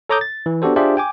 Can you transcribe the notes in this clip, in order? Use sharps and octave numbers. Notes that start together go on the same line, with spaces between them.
A4 C#5 A#5 D6 D#6 G6
A6
E3
B3 D4 F#4 G4 A4 C5
D4 F4 G4 G#4 C5 E5
G5 G#5 D6